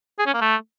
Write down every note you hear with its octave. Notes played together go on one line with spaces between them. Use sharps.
G#4
C#4
A#3
A3